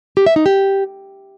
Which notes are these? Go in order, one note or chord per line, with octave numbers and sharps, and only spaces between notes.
G4
E5
D#4
G4